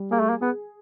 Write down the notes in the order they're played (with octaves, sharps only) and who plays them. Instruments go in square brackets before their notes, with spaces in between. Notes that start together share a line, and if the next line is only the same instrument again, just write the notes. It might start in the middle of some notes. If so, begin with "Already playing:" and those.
Already playing: [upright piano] G3
[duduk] A#3 [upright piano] G#4
[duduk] A3
A#3
[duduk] B3 [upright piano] G#4